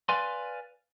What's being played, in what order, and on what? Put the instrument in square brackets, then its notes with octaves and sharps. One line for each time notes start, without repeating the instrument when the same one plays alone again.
[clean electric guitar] B4 D5 F5 G#5 C6